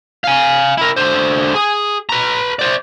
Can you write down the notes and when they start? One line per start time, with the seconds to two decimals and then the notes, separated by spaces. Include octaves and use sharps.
0.24 F5 G#5
0.78 E4 A#4
0.96 D3 C5
1.55 G#4
2.09 B4 A#5
2.59 C5 D5